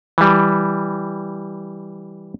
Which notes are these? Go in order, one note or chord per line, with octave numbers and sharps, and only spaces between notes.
E3 G3